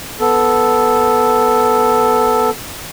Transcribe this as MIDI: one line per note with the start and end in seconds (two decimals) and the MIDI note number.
0.20 2.50 59
0.20 2.50 69